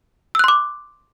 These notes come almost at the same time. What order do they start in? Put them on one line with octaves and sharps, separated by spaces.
E6 F#6 C6 D6